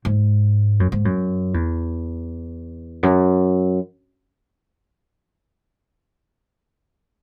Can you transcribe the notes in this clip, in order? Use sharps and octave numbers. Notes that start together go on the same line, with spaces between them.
G#2
F#2
G#2
F#2
E2
F#2